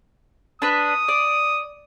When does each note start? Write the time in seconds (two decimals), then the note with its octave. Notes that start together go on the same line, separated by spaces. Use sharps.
0.62 D4 B4 D#6
1.08 D5